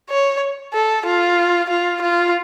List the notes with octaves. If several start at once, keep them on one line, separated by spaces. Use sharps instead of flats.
C#5
A4
F4
F4
F4